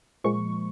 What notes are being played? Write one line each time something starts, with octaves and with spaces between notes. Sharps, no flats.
A#2 F3 G#3 C#6